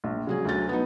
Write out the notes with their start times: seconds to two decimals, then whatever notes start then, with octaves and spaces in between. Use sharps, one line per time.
0.04 A#1
0.27 C#3 F#3 G#4
0.45 D2 F#3 A6
0.69 B3 D#4